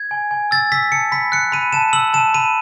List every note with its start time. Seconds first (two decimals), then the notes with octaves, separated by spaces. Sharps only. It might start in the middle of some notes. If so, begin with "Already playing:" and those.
Already playing: G#6
0.11 G#5
0.31 G#5
0.51 E6 A6
0.72 E6 B6
0.92 A5 C#7
1.12 B5 B6
1.32 F#6 C#7
1.52 B5 D#7
1.73 A5 E7
1.93 E6 F#7
2.14 A5 E7
2.34 B5 D#7